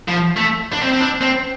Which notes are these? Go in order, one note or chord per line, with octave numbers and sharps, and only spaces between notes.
F3
A3
D4
C4
C4
D4
C4